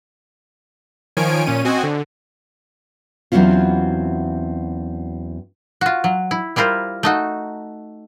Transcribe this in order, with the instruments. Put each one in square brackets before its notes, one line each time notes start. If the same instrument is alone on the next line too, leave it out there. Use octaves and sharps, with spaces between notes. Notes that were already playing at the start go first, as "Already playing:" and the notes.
[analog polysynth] D#3 F3 C#5 G#5 D7
A#2 C#4 D#7
C4 F#4 D#5 G#5
D3
[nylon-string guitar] E2 F#3 C4 C#4 E4 F4
[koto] F4 F#4
F#3
E4
G3 E4 F4 A#4 C5
A3 D#4 F#4